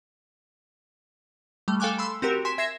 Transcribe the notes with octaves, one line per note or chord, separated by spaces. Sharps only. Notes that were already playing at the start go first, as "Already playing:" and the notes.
G3 A3
A4 F5 G5 G#5 D6 F#6
B5 C6 E6
C4 F#4 G4 A#4
G#5 C6 B6 E7
E5 G#6 A#6 C7 E7